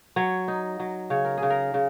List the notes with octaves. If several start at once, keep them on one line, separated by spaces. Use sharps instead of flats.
F#3 C#5
D#4
F#3
C#3 C#5
A#4
G#4
C#3
A#4
C#3